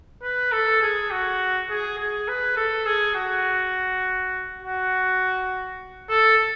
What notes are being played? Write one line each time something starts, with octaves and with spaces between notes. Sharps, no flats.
B4
A4
G#4
F#4
G#4
G#4
B4
A4
G#4
F#4
F#4
A4